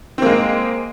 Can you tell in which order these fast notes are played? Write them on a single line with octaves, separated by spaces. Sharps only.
C4 A#3 G#3